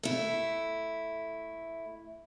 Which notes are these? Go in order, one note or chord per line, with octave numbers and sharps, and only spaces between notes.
A3 E4